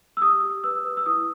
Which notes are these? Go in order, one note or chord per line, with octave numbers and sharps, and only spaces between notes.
E6
G4 D#6
G4
B4 E6
B4
E6
E4 D#6